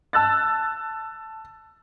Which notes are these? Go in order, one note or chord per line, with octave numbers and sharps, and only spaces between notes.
A5 E6 F#6 A6